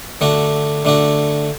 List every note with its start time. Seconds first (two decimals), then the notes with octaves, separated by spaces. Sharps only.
0.21 D3 A3 D4 F#4
0.85 D3 A3 D4 F#4